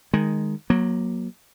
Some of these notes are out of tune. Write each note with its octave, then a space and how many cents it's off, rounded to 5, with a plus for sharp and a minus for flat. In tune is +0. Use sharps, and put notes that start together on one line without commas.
D#3 -5 G#3 +0
F#3 -10 A#3 +20